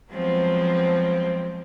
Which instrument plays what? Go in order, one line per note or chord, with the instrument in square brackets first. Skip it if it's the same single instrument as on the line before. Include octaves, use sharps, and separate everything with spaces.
[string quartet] F3 F#3 G#3 B3 C4